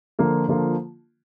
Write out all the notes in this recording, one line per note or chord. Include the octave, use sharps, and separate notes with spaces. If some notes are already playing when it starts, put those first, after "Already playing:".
D3 F3 A#3 F4
D3 F3 A#3 F4